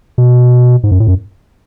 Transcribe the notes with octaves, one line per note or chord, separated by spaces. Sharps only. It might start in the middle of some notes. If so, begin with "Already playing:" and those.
B2
G#2
F#2
A2
F#2